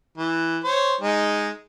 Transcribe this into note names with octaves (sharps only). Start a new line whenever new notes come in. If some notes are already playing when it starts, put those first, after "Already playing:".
E3
C5 C#5
G#3 D#4